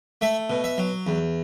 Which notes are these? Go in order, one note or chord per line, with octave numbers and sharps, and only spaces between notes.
A3 E5
B2
E5
F#3
E2